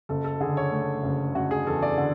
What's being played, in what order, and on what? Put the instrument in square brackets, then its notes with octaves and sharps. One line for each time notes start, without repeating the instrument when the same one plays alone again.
[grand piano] F#1 A4
A4
D3 G#4
C#5
A3
F#1
F#1 F#4
G#4
E2 A4
D5
D3